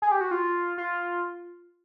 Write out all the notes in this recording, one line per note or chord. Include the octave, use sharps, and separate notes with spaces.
G#4
G4
F#4
F4
F4